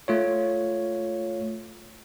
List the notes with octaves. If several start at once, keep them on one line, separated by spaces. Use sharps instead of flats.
A3 F4 C#5